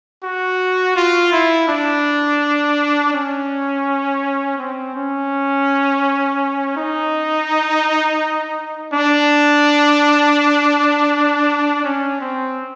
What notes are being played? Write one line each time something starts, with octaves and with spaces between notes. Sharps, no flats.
F#4
F4
E4
D4
C#4
C4
C#4
D#4
D4
C#4
C4